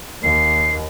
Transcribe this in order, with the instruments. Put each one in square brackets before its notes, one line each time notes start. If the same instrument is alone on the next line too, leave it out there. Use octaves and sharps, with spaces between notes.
[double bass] D#2 [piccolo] C7